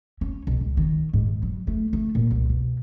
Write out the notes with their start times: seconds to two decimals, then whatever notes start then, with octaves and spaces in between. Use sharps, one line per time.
0.21 C#4
0.47 B1
0.61 C#2
0.77 D#3
1.13 G#2
1.28 G#2
1.43 F#3
1.67 A3
1.93 A3
2.15 A#2
2.31 C2
2.49 B2